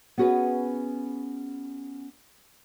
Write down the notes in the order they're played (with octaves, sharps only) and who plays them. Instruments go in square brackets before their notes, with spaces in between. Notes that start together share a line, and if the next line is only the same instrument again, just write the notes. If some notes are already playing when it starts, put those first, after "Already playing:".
[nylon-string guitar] B3 C#4 F#4 G#4 B4